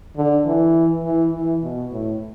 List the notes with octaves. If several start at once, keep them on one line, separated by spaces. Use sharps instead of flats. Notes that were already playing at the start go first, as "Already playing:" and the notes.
D3
E3
E3
E3
B2
A2